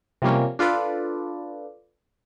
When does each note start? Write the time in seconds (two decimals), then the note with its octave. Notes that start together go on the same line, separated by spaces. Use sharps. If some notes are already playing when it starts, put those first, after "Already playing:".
0.22 C3 F3 G3 A#3 C#4
0.59 D4 F4 A4 B4 D5